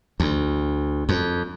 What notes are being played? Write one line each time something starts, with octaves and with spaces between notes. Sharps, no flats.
D2
F2